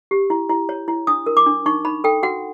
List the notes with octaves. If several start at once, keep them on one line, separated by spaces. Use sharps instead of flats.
G4
E4
E4
C#5
E4
D4 D#6
A#4
D6
D4
D#4 C#6
D#4 B5
A4 G5
F#4 F#5